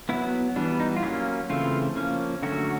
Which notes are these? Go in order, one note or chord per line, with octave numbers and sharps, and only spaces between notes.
F#3 B3 E4
E3 G3 B3 D4
D#4
F4
F#3 A#3 C#4 E4
C#3 E3 A3 C4 F4
F3 A#3 C#4
D3 F#3 A3 C#4 F#4